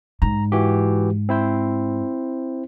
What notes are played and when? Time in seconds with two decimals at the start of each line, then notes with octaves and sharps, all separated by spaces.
0.22 G#2 A#5
0.52 E3 F#4 G4
1.29 C4 E4 C5